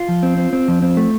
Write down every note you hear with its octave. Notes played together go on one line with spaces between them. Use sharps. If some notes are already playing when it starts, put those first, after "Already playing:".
Already playing: F4
F3
C4
C4
C4
F3
C4
A3